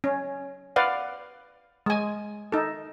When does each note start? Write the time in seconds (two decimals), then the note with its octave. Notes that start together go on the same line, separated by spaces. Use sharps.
0.04 C#4
0.76 B4 D5 F5 F#5
1.86 G#3 G#5
2.52 D#4 A4